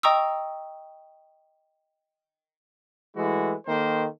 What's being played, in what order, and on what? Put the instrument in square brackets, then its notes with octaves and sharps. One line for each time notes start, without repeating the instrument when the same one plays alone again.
[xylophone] D#5 G5 A#5 C#6 D#6 E6
[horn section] E3 G#3 A3 E4 F#4
D#3 A#3 A4 A#4 C5